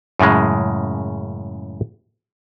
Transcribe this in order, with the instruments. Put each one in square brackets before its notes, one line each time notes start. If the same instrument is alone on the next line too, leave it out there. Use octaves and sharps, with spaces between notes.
[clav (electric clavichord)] F#2 A2 C#3 G#3